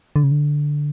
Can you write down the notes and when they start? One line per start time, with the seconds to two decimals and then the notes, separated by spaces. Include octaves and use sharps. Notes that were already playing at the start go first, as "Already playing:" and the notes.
0.16 D3
0.23 C#3
0.31 D3